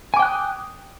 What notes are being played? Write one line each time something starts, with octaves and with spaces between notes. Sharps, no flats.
G5 G#5 D6 D#6 F#6